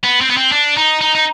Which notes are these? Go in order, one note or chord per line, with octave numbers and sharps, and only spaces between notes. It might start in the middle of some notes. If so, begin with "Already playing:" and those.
B3
C4
B3
C4
D4
D#4
D#4
D#4